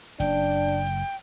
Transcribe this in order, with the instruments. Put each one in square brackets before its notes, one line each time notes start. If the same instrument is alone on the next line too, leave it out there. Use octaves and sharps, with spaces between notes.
[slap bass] F#1 [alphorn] D4 [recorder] G5